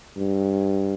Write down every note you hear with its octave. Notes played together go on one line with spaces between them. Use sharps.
G2